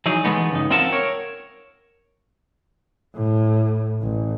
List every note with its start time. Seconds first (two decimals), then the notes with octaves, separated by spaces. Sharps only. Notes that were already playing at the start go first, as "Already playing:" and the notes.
0.06 E3 F#3 D#4 G#4
0.24 E3 G#3 A3 B3 D#4
0.51 C#2 G2 D#4
0.70 C4 F4 A#4 E5 F#5 A5
0.92 A#4 C#5
3.16 A2
4.02 A1